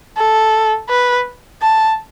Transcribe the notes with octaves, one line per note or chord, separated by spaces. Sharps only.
A4
B4
A5